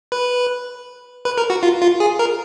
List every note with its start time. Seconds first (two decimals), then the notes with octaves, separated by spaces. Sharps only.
0.12 B4
1.25 B4
1.38 A#4
1.50 F#4
1.63 F4
1.82 F4
2.00 G#4
2.19 A#4